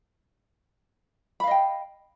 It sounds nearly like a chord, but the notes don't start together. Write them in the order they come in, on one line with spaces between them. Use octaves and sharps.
B5 F5 D#5 G5